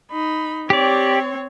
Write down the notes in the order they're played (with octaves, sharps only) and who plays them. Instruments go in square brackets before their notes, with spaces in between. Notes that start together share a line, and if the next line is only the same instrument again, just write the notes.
[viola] D#4 B5
[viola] C4 C#5 [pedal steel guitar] G4 D5